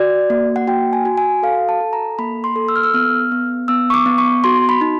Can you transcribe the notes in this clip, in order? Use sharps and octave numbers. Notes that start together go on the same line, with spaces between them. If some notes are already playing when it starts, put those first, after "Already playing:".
Already playing: F#4 D5
A#3
F#5
F#4 G5
G#5
F#4
G#5
A4 F5
A5
A4
A#5
A#3 B5
C6
A4
E6
F6
E6
B3 F6
B3
B3 E6
C#6
D6
B3
C#6
F#4 C6
B5
D#4